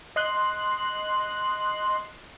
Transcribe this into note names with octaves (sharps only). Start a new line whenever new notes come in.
D#5 C6 F#6